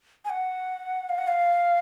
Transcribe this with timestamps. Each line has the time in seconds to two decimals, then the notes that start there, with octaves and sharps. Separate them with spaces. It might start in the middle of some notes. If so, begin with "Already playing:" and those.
0.25 G#5
0.30 F#5
1.09 F5
1.18 F#5
1.28 F5